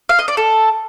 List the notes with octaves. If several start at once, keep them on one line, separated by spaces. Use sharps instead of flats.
F5
D#5
D5
A4